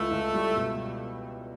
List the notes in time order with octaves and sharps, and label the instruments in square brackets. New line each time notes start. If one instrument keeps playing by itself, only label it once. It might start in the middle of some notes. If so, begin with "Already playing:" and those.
Already playing: [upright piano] C#2 E4 [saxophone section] A3
[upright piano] C#2
G3
B2